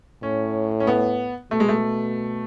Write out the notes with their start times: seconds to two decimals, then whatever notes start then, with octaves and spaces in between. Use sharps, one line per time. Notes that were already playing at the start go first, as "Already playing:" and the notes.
0.23 A2 C#4
0.80 C#4
0.87 B3
1.51 B2 A3
1.60 G#3
1.69 A3